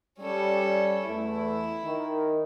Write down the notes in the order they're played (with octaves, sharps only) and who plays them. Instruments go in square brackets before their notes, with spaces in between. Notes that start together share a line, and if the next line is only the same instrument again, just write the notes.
[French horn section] G3 [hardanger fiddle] C#4 A4
[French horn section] E2 A3 [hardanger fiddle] E4
[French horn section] D#3